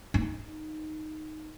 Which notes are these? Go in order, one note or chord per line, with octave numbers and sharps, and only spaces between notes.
D#4